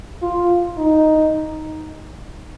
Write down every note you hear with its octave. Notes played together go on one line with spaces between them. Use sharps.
F4
D#4